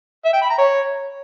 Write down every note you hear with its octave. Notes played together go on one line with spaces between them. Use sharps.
E5
G5
B5
A#5
C#5